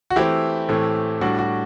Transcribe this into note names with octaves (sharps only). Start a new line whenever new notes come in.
F#4
E3 A3 C4 E4 G4
A2 E3 A3 C4
A2 G3 D4 F#4
F#4